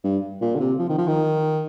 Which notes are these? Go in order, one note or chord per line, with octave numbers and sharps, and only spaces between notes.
G2
A#2
D3
C3
F3
D#3
F3
D#3